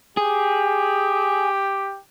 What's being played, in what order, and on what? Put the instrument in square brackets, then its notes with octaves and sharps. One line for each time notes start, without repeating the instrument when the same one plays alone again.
[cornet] G4 [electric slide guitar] G#4